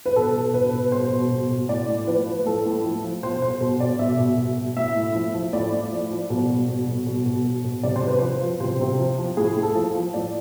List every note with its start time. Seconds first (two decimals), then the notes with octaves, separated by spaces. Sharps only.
0.06 B4
0.16 B2 A4
0.34 B2
0.54 B2 B4
0.73 B2
0.92 B2 C5
1.11 B2
1.32 B2
1.51 B2
1.69 A2 D5
1.89 A2
2.07 F3 B4
2.27 F3
2.46 A2 A4
2.65 A2
2.84 F3
3.04 F3
3.23 B2 C5
3.42 B2 C5
3.61 B2
3.80 B2 D5
3.99 B2 E5
4.19 B2
4.38 B2
4.57 B2
4.76 A2 E5
4.96 A2
5.15 F3
5.34 F3
5.53 A2 D5
5.73 A2
5.92 F3
6.11 F3
6.30 B2
6.50 B2
6.68 B2
6.87 B2
7.07 B2
7.26 B2
7.45 B2
7.65 B2
7.83 C3 D5
7.96 C5
8.03 C3 B4
8.19 F3 C5
8.41 F3
8.60 C3 C5
8.80 C3
8.99 F3
9.18 F3
9.37 A2 G#4
9.57 A2
9.63 A4
9.75 F3
9.94 F3
10.14 A2 D5